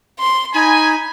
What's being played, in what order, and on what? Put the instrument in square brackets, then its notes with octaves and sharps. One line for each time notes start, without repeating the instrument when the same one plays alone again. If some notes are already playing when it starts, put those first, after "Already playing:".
[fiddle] C6
[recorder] D#4 [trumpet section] G#5 [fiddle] B5